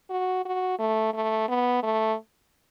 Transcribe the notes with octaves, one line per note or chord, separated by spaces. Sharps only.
F#4
F#4
A3
A3
B3
A3